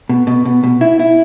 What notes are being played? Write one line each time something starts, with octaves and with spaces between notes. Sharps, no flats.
B2
B2
B2
B2
E4
E4